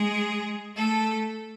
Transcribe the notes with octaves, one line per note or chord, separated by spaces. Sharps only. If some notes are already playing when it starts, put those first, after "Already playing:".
Already playing: G#3 G#4
A3 A4